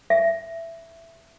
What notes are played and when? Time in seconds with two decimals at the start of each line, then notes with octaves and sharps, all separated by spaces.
0.10 E5